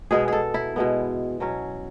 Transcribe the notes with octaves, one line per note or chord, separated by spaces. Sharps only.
B2 G#3 B3 G#4
G#4 A4
E4
B2 G#3 B3
B2 F#3 C#4